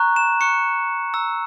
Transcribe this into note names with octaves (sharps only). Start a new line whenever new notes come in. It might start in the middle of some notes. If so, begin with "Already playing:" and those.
Already playing: A#5 C#6 F#6
E7
A#5 C#6 F#6 C#7
A#5 E6